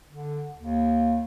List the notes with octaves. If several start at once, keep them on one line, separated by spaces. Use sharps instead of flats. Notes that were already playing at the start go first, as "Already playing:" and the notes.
D3
D#2